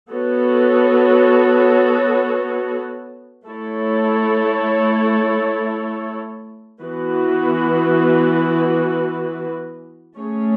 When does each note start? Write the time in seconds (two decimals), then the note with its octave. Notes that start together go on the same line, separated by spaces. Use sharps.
0.11 B3 F#4 A4 C#5
3.46 A3 E4 A4 C#5
6.82 E3 B3 F#4 B4
10.17 A3 C#4 G#4 C#5